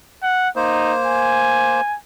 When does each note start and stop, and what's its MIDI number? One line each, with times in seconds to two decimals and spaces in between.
0.23 0.49 78
0.56 1.81 58
0.56 0.94 63
0.56 1.81 72
1.06 1.97 80